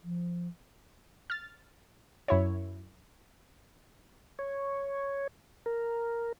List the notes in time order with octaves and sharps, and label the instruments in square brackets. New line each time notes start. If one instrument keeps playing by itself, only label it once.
[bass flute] F3
[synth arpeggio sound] F6 A6
F#2 E4 C#5
[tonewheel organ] C#5
A#4